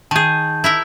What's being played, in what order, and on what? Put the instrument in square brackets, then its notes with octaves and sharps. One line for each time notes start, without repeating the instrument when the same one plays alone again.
[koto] D#3 G#4 [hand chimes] A5 G6
[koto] E4 A#4 E5